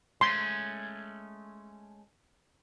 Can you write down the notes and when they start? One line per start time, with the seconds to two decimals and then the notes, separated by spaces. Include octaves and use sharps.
0.21 G#3 A3 C#4 C6